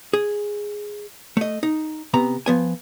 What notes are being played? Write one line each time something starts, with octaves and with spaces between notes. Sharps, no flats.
G#4
A3 D#5
D#4
C3 B3 A#5
F3 B3 G#5